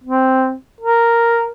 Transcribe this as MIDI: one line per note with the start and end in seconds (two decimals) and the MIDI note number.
0.04 0.54 60
0.81 1.49 70